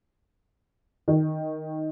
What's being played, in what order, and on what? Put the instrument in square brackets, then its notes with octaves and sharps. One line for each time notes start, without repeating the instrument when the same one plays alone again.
[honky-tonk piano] D#3